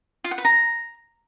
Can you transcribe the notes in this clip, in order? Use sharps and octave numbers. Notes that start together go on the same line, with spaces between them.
F4
F#5
B4
A#5